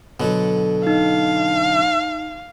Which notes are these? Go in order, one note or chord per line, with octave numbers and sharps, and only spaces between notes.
B2 D3 F#3 A4
D#4 F5